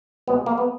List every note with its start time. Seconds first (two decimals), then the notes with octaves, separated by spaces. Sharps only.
0.27 C#2 B2 G#3 B3
0.46 A#3
0.58 B3